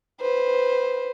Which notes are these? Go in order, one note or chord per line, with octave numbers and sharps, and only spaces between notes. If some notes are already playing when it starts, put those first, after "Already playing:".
B4 C5